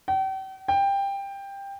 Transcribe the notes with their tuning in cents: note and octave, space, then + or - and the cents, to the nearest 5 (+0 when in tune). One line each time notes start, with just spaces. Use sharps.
G5 -40
G5 +15